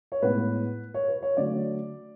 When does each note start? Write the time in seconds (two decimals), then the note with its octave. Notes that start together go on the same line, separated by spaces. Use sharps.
0.12 C#5
0.22 A2 G#3 B3 B4
0.94 C#5
1.08 B4
1.22 C#5
1.37 D3 F#3 A3 D5